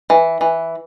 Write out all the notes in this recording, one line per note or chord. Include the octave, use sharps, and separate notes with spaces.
E3
E3